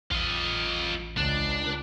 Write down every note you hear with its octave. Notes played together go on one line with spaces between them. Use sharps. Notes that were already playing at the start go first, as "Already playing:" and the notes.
A1 F4 D#5
C#2 D4